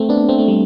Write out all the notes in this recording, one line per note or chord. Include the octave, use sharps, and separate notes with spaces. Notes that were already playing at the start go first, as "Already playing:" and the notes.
Already playing: A3 C4
B3 D4
A3 C4
A3
G3